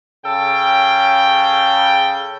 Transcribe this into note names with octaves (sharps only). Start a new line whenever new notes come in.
C#3 A4 G5